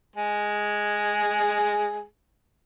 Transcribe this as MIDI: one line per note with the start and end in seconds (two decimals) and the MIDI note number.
0.16 2.03 56
0.16 2.03 68